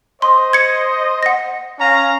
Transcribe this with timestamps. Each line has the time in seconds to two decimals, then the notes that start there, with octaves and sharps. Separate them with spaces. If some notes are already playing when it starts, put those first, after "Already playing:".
0.22 C5 D#5 C6
0.53 G#6 C#7
1.23 F#5 A#6
1.80 C#4 F5 A#5